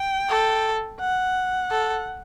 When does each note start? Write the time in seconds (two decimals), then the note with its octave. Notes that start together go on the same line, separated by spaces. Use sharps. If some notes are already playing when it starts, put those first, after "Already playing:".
Already playing: G5
0.29 A4
1.00 F#5
1.71 A4